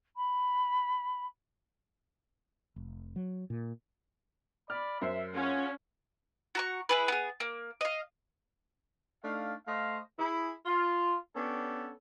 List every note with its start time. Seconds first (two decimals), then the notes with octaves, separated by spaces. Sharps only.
0.16 B5
2.76 F1
3.16 F#3
3.50 A#2
4.70 D5 B5 F6
5.01 F#2 C5 E5 C7
5.36 C#4 F4 G#4 F#5
6.55 F#4 A#5 C#6
6.89 E4 G#4 B4
7.08 B3 G#4
7.40 A#3
7.81 D#5 F5
9.23 A3 D4 D#4 F5
9.66 A3 C5 D#5 F5
10.18 E4 G#4
10.65 F4
11.35 B3 C#4 D4 G4 A4